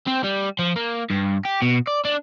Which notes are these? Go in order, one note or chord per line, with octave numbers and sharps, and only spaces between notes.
C4
G3
F3
A#3
G2
G4
B2
D5
D4